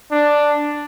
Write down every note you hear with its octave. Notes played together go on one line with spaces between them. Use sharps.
D4